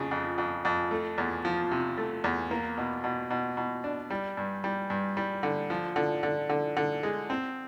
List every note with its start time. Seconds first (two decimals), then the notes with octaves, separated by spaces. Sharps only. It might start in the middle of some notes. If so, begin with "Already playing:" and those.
Already playing: F2 C#3
0.11 F2
0.38 F2
0.65 F2
0.91 A3
1.18 E2
1.45 F3
1.71 C3
1.98 A3
2.24 E2
2.51 A#3
2.78 B2
3.04 B2
3.30 B2
3.57 B2
3.84 D4
4.10 G3
4.37 G2
4.64 G3
4.90 G2
5.17 G3
5.43 D3
5.70 F3
5.96 D3
6.23 D3
6.50 D3
6.77 D3
7.03 G#3
7.30 C4